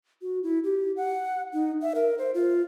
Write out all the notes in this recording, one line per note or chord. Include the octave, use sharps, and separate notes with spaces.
F#4
E4
G4
F#5
D#4
E5
A#4
C5
F4